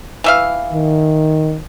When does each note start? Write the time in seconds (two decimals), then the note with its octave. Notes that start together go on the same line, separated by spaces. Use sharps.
0.24 E3 E5 F5
0.73 D#3